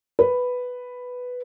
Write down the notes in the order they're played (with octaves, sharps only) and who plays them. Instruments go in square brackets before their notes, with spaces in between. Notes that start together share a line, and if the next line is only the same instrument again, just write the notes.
[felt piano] B4